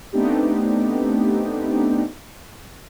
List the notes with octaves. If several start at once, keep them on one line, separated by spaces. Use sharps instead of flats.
A3 B3 C4 D4 D#4 G4